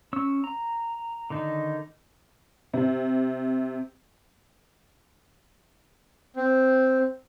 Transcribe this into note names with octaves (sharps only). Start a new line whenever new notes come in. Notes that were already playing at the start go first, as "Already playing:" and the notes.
C#4 E6
A#5
D3 D#3 D#4
C3
C4